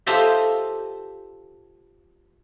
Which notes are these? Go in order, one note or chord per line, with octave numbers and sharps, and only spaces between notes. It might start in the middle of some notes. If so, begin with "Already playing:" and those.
F4 G4 A4 C5 D#5 E5